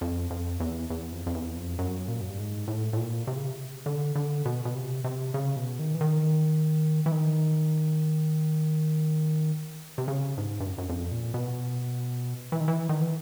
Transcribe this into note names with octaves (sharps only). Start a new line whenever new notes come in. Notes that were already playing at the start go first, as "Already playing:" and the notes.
F2
F2
E2
E2
F2
F2
E2
F2
F#2
A#2
F#2
G2
G#2
A2
A2
A#2
C3
C#3
C3
D3
D3
B2
B2
C3
C3
C#3
B2
D#3
E3
D#3
E3
D#3
C3
C#3
G#2
G2
F#2
F#2
F2
A#2
B2
E3
D#3
E3
D#3
E3